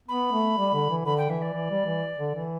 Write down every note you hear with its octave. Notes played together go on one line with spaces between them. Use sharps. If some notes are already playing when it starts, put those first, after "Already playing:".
B3 B5
A3
G3
D3
E3
D3 B5
G5
E3 E5
D5
E3
G3
E3
D3
E3